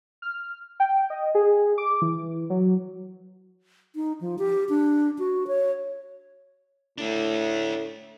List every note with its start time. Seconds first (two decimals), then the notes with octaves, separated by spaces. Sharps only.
0.22 F6
0.80 G5
1.10 D#5
1.35 G#4
1.78 D6
2.02 E3
2.50 F#3
3.96 D#4
4.21 F3
4.39 G4
4.69 D4
5.19 F#4
5.47 C#5
6.98 A2 A3 D4